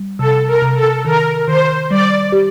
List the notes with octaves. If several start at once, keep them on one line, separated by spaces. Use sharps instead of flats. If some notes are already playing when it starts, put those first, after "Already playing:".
Already playing: G3
C3 A4
A#4
C3
A4
D#3 A#4
D#3 C5
G3 D5
G4